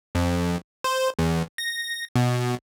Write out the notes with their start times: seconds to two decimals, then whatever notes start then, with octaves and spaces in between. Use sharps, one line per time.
0.15 F2
0.84 C5
1.19 E2
1.58 A#6
2.16 B2